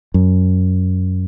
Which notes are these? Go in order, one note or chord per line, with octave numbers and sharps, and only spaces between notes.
F#2